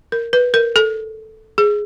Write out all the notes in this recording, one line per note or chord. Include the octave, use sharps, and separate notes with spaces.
A#4
B4
A#4
A4
G#4